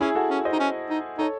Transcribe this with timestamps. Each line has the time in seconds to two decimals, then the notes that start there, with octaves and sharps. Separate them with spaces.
0.01 C#4 E4 G#4
0.15 F#4 A4
0.30 C#4
0.45 C5 D#5
0.53 D#4
0.60 C#4
0.90 D#4
1.18 D#4 A4 C#5